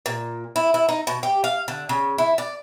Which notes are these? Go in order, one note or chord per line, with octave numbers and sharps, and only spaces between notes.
A#2
E4
E4
D#4
B2
G4
F5
D3
C#3
E4
D5